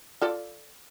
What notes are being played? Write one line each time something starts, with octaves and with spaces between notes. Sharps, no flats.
F4 A4 D5